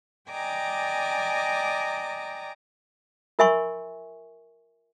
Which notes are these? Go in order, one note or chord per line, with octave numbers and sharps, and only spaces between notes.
D5 D#5 G5 G#5 A#5 D6
F4 A#4 E5 G#5 C6 C#6